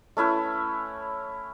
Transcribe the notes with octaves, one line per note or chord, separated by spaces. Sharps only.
A3 C#4 E4 B4